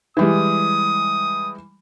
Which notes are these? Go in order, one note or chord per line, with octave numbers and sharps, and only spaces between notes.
E3 G3 G#3 D#6